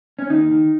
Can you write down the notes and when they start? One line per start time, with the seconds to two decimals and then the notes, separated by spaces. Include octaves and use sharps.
0.19 C#4
0.30 D#2 D#4
0.51 D#3